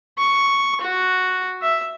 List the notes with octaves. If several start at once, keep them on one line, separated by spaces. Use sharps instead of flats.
C#6
F#4
E5